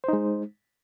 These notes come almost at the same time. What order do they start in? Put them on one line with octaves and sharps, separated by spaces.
C5 D#4 G#3